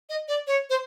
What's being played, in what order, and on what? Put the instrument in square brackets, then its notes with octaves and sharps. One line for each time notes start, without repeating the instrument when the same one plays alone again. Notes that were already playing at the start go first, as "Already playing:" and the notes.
[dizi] D#5
D5
C#5
C5